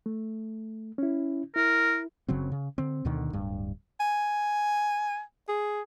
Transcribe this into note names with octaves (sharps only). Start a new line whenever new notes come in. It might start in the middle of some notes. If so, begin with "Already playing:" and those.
A3
C#4 E4
E4 A#4
F#1 C#3 F#3 C4
C#3
D3 C4
D2 B2 D3 D#3
D1 G2
G#5
G#4